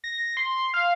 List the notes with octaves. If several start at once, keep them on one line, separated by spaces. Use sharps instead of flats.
A#6
C6
F5